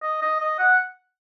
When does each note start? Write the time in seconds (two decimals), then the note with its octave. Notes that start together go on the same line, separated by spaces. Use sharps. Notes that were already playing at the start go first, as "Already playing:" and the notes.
0.02 D#5
0.22 D#5
0.40 D#5
0.59 F#5